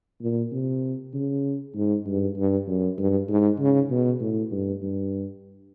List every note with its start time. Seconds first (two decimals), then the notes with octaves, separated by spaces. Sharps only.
0.22 A#2
0.52 C3
1.14 C#3
1.75 G#2
2.06 G2
2.37 G2
2.68 F#2
2.98 G2
3.29 G#2
3.59 C#3
3.91 B2
4.21 A2
4.52 G2
4.82 G2